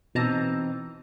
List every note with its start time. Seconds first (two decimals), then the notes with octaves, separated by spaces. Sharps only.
0.15 B2 E3 C4 D#4 A5 A#5